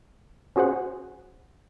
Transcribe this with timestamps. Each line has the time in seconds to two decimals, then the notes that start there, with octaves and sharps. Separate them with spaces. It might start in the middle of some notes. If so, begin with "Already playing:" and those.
0.56 C#4 F#4 G#4 C5 F#5